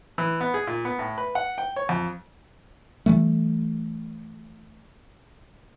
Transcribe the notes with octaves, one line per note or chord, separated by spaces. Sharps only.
E3
B3
G#4
A#2
B3
A2
B4
F#5
G5
C#5
F2
E3 G3 A3